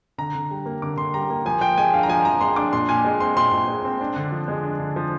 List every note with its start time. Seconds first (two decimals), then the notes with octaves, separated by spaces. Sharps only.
0.18 D3 A#5
0.35 D3
0.51 G3
0.66 A#3
0.82 D3 D6
0.97 D3 C6
1.14 G3 A#5
1.30 A#3
1.46 F3 G#5
1.61 F3 G5
1.77 G#3 G#5
1.93 D4 F5
2.03 A#5
2.09 F3 G#5
2.25 F3 A#5
2.41 G#3 C6
2.56 D4 D6
2.73 A#2 C6
2.89 A#2 G#5
3.05 G#3
3.20 C4 C6
3.36 A#2 C6
3.52 A#2
3.68 G#3
3.85 C4
4.01 D4
4.16 D3
4.32 F3
4.48 G#3
4.63 D4
4.80 D3
4.96 F3